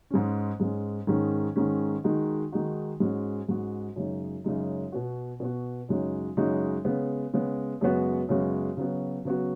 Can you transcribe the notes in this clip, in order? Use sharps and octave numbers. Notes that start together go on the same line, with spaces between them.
G#2 G#3 C#4
G#2 G#3 C#4
G#2 D#3 G#3 C#4
G#2 D#3 G#3 C#4
D#3 G#3 D#4 F#4
D#3 G#3 D#4 F#4
G#2 G#3 C#4 F#4
G#2 G#3 C#4 F#4
F#2 C#3 G#3 D#4
F#2 C#3 G#3 D#4
B2 B3 F#4
B2 B3 F#4
F#2 C#3 G#3 D#4 F#4
F#2 C#3 G#3 D#4 F#4
C#3 G#3 B3
C#3 G#3 B3
F#2 C#3 G#3 B3 F#4
F#2 C#3 G#3 B3 F#4
C#3 F#3 B3 F#4
C#3 F#3 B3 F#4